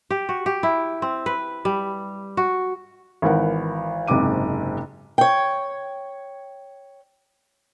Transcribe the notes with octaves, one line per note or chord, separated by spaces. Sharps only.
G4
F#4
G4
E4
C4
B4
G3
F#4
G#1 E3 A#4 F#5
F#1 G#2 C3 D6 D#7
C#5 G5